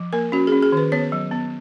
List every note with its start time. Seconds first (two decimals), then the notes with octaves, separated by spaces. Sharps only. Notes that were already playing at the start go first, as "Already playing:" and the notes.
Already playing: F3
0.13 A#3 A#4
0.32 C#4 F#4
0.47 G#4
0.52 C#4
0.63 G#4
0.72 D#3 B4
0.92 B3 C#5
1.12 F#3
1.31 B3